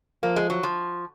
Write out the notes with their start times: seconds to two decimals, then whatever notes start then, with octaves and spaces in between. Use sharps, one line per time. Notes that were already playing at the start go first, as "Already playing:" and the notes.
0.23 F3 A#3
0.36 G#3
0.50 F#3
0.63 F3